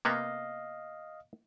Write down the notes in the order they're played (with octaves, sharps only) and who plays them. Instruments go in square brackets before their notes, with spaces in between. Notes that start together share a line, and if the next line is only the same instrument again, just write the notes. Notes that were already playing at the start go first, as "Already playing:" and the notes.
[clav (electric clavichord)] C3 A#3 B3 [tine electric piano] D#5 F5